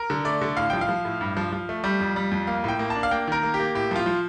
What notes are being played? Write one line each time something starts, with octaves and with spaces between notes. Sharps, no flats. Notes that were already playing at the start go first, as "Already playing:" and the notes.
Already playing: A#4
D3
A3 D5
D3
A2 F5
F3 G5
F5
F3
A2
G2
F3
F3
A3
G3
F2
G3
F2
A#3 F5
A2 G5
A#3
A5
D4
F5
A#3 G5
D#3 A#4
A#3
G4
A#3
A2 G4
F3 F4
F3